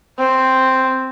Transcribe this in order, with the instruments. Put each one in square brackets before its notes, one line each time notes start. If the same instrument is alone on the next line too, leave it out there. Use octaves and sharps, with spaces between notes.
[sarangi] C4